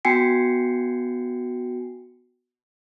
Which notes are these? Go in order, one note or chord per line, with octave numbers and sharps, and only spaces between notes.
B3 F#4 G5 G#5 C7 C#7